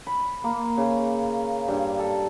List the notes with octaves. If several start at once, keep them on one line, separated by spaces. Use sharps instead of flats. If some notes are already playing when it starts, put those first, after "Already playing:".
B5
A#3
C#3
G2
A4